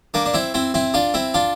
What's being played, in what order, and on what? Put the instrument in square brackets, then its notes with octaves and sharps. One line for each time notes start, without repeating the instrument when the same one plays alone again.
[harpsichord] A#3 D4
D4
C4 E4
C4 E4
C4 E4
D4 F4
C4 E4
D4 F4